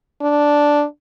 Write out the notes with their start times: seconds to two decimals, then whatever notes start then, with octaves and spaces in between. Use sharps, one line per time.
0.21 D4